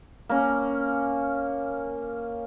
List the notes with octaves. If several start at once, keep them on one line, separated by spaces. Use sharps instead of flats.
A#3 C#4